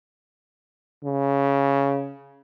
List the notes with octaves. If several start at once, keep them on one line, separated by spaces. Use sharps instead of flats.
C#3